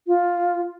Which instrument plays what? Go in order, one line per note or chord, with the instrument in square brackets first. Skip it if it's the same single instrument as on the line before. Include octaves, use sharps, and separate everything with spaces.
[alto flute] F4